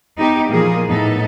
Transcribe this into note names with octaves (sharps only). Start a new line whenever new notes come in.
B3 D#4 G4
A#2 E3 F3 A#3 G#4
A2 B3 D#4 A4